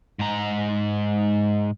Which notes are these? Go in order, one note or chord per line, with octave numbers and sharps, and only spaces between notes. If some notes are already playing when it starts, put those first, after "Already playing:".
G#2 A#5